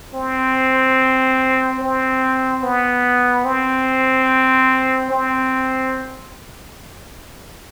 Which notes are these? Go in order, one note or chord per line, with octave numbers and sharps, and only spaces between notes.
C4
C4
B3
C4
C4